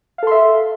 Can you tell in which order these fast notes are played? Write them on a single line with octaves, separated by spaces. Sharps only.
F5 A4 C6 E5